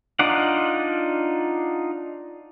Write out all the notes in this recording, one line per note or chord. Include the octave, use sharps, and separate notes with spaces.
D4 D#4 F4 D5 F#5